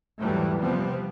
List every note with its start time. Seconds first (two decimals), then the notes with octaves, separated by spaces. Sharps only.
0.20 E2 G#2 E3 F#3 G3 A3
0.60 C3 F3 G3 B3 C4